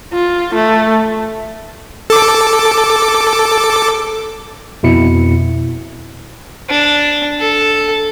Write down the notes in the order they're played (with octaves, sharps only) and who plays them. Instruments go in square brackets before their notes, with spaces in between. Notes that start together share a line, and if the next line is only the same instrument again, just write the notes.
[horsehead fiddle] F4
A3
[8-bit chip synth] A4 D6
[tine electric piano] F2 B2 E4 C#7
[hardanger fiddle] D4
A4